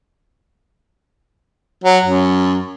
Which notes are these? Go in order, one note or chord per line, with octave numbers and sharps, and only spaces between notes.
F#3
F#2